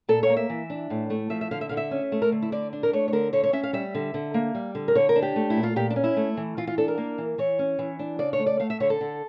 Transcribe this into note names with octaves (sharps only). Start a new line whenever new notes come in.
A#2 A4
C#5
A#3
E5
E3
D4
A2
A3
F3 E5
E5
D3 F5
E5
D3 F5
E5
C#4
A3
A#4
D3
E4
D3 D5
D4
A#4
A3 C#5
C#5
D3 A#4
D3 C#5
C#5
C#4 E5
F5
G3 E5
D3
D3
A#3
G3
D3
A#4
D3 C#5
A#4
D4
G4
A3
E4
A#2
F4
A#2 G4
D4
C#4
E4
A3
E3
E3 F4
F4
D4 A4
A#4
A#3
E3
E3 C#5
C#4
E3
D4
C#3 D5
C#5
A3
D5
A3 F5
E5
D3 C#5
A4
D3